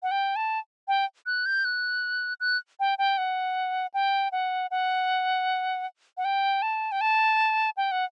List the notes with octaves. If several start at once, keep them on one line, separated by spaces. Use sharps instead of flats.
F#5
G5
A5
G5
F#6
G6
F#6
F#6
G5
G5
F#5
G5
F#5
F#5
F#5
G5
A5
G5
A5
G5
F#5